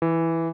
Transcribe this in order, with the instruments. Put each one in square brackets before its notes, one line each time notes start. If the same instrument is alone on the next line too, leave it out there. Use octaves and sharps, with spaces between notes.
[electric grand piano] E3